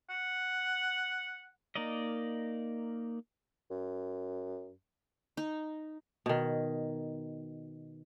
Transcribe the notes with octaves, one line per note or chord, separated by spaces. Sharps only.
F#5
A#3 D#4 A#4 D5 D#5
F#2
D#4
B2 D#3